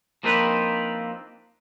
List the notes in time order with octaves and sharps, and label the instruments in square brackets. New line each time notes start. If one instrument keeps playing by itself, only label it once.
[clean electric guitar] F3 A#3 C4 D4 D#4 B4